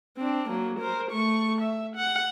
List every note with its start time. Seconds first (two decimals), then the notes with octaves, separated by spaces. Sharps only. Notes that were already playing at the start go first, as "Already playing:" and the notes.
0.17 C4 D4
0.49 F#3 A#3
0.80 A#4 C5
1.12 A3 C#6
1.61 E5
1.96 F#5